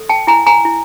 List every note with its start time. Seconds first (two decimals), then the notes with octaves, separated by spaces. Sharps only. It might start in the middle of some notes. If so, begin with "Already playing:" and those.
Already playing: A4
0.09 G5 A5
0.27 E4 G#5 A#5
0.47 G#5 A#5
0.65 E4